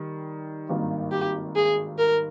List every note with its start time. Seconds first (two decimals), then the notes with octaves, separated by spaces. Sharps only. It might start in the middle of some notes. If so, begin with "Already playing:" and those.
Already playing: D#3 G3
0.69 G#1 G2 D#3 A#3
1.12 G4
1.56 G#4
1.99 A#4